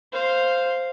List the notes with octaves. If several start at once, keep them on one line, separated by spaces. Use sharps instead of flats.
C5 F5